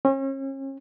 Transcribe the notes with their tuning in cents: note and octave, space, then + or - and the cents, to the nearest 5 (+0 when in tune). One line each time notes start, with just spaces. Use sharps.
C#4 -40